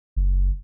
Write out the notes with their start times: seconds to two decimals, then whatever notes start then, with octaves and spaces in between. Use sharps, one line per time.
0.16 F#1